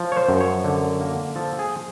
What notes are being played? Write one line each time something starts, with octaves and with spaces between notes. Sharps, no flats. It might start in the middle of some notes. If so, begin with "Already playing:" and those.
Already playing: F3
C#5
C5
F#2
C#5
D3
A#3
F3 A4
G#4